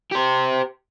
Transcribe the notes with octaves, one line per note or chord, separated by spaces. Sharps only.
G4 C5